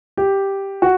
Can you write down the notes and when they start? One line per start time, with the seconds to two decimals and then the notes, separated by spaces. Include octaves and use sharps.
0.17 G4
0.82 F#4